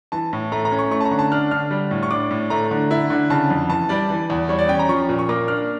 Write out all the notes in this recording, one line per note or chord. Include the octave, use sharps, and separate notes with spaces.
E3 A5
A2
A3 A#5
A#5
C#4
C#6
A3 C#6
A5
A#5
D3
A5
D4 F6
D3 F6
G3
A2
C#6
D4 D6
A2
A3 A#5
D3
E4
D3
C#3 A5
F2
E3 A5
G3 D5
E3
E2
G3 C#5
D5
C#4 G5
A#5
F3 C#6
A#2
C#6
A#3 D6
D4 F6